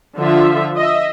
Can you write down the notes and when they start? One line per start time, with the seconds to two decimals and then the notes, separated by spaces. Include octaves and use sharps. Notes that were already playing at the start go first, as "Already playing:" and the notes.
0.17 D3 F3 F4 E5
0.77 D#5 E5